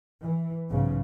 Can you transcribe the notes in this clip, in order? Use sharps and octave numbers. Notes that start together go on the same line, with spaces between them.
E3
B1 G#2 C#3